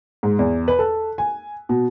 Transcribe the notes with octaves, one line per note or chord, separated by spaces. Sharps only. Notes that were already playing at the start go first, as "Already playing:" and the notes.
G#2
E2
B4
A4
G#5
B2